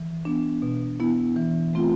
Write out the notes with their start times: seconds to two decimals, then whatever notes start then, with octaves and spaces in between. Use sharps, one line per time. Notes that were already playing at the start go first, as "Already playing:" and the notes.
Already playing: E3
0.25 B3 D4
0.62 B2
1.00 B3 E4
1.36 E3
1.74 A3 C4 F4